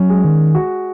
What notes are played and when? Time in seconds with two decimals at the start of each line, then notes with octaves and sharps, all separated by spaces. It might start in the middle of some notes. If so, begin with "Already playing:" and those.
Already playing: F#3 C#4
0.10 G#3
0.24 D#3
0.55 F#4